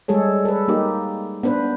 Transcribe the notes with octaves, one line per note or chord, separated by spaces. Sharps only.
G3 G#3 G#4 A4 C#5
A4 B4
A#3 D#4 G4
B3 D4 B4 C5